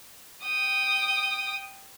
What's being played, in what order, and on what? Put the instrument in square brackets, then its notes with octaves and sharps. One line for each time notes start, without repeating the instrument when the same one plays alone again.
[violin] G5 D#6